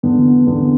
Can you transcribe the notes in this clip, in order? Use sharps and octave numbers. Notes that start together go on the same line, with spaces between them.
E2 D3 B3
E2 D3 B3